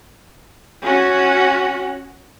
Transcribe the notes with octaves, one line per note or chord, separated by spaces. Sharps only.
C#4 F#4